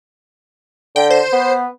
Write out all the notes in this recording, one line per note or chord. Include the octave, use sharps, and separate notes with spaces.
D3 G5
C5
B3